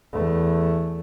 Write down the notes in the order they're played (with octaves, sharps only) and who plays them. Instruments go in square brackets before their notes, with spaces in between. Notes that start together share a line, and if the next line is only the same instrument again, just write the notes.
[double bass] E2 A3